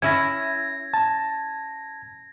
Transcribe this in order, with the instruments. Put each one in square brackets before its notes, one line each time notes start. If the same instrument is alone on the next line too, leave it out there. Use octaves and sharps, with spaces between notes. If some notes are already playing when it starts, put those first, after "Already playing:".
[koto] C#4 E4 [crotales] G#6 A#6
[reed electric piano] A5